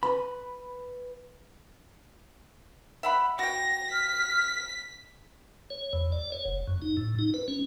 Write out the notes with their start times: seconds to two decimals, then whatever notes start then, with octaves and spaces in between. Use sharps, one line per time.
0.03 B4 B5
3.03 E5 F#5 B5
3.39 F#4 G5 A#6
3.92 F6 B6
5.70 C#5
5.93 E2
6.12 D5
6.32 C#5
6.46 F#1
6.67 F#2
6.82 D#4
6.97 A2
7.19 D#4
7.34 B4
7.48 C#4